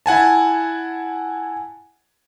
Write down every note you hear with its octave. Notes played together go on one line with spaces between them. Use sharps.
E4 F#5 G#5 A5